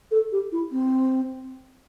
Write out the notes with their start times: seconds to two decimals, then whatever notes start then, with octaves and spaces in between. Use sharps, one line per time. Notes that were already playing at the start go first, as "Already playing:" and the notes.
0.11 A4
0.32 G4
0.52 E4
0.71 C4